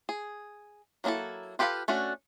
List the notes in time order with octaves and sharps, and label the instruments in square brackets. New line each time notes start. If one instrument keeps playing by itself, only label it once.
[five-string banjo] G#4
F#3 A#3 D4 E4 A4
F4 G4 A4 B4 F5
A3 C#4 D4 F#4